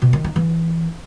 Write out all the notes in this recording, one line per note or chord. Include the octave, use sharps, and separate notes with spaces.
B2
D#3
D#4
E3